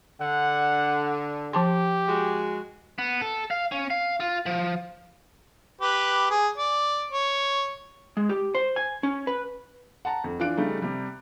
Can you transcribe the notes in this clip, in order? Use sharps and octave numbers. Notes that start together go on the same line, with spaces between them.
D3 F#5
F3 G4 A5 C6
G#3 F#4
B3
A4
F5
C#4
F5
F4
F3
G4 B4
G#4
D5
C#5
G#3
G4
C5
G#5
C#4
B4
F#5 A5 A#5
F2
E3 D4 F4 F#6 D7
C#3 G3 A3 D#4
C3 G3